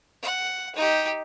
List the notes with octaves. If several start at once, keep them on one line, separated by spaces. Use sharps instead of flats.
F#5
D#4 G4